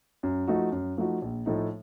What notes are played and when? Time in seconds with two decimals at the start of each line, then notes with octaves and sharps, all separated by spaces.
0.23 F#2
0.47 F3 A3 D#4 F#4
0.72 F#2
0.98 F3 A3 D#4 F#4
1.22 A#1
1.46 A2 F3 A3 D#4